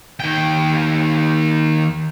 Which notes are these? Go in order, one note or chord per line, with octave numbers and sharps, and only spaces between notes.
D#2 G5